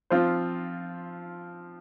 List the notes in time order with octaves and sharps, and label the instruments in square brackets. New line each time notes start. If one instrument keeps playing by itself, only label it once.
[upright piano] F3 C4 F4 C5